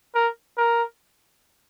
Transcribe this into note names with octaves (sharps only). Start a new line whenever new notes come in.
A#4
A#4